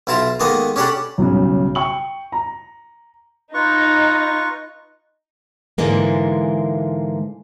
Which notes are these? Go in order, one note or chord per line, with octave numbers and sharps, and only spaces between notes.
B1 E4 F4 A5 A#5
D#3 G#3 A#3 B3 A4 D#5
C#4 D4 G4 A4 F#5 B5
B1 G2 C#3
G5 C#6 F#7
A#5
D#4 F4 B4 C#6
G#2 D3 E3 G#3 A#3